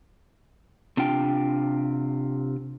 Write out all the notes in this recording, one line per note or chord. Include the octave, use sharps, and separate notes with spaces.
C3 D4 F4 G5